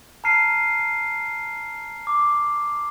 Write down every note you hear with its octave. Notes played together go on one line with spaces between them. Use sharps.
A5 A#5 F6 C7 D#7
D6